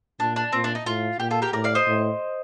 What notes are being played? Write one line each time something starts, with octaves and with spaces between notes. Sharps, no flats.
A#2 D4
D4
A#2 C4
D4
D#4
A2 F4
A#2 G4
F4 A4
G4 A#4
A2 A#4 D5
D5 F5
C5 D#5
A2